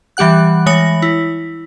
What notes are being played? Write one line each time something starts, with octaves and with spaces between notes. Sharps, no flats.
E3 G3 G4 F#5 F#6
E3 G#3 C#5 D#6 A#6 F#7
E4